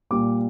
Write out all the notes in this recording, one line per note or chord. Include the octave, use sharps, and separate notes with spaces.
A#2 G3 A#3 D6